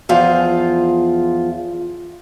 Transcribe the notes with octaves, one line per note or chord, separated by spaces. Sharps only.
E2 F3 F4 G#4